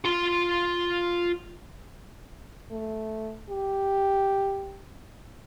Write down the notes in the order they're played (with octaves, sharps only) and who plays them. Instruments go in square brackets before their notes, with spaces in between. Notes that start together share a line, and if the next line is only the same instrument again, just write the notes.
[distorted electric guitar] F4 C6
[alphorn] A3
G4